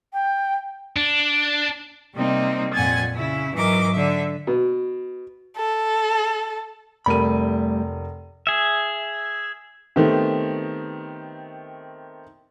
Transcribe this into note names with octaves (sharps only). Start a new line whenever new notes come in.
G5
D4
C3 G3 A#3 C4 D#4
F2 A#2 F#5 G#5 G#6 A6
C#3 E4
G#2 E3 F#3 D#4 A#4 D6
D3 E5
B2
A4
F1 G3 A3 A#4 B5 D#7
G#4 E5
D#3 A3 B3 C4 G4